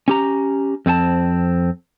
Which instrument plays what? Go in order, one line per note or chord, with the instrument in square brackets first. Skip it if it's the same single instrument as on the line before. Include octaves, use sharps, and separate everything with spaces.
[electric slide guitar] C#4 G4 A#5
F2 C4 F4 A5